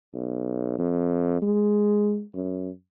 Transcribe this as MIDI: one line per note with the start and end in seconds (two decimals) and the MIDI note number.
0.14 0.76 35
0.78 1.41 41
1.42 2.23 56
2.34 2.70 42